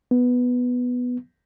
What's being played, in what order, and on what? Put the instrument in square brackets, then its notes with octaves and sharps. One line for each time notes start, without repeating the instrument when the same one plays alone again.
[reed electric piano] B3